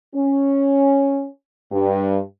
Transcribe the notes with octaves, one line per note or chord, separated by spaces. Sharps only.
C#4
G2